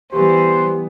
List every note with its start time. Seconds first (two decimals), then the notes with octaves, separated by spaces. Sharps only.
0.12 E3 G3 B3 G4 C5